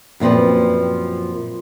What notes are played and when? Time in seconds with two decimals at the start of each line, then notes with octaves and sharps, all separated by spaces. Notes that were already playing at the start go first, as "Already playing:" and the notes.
0.20 F#2 A#2 F3 C4 B4